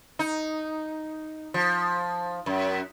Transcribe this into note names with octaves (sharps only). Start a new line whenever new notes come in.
D#4
F3
F#2